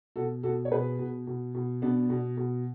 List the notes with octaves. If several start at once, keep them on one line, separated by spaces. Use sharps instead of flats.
B2 F#4 A4
B2 F#4 A4
C#5
B2 G#4 B4
B2
B2
B2
B2 B3 D4
B2
B2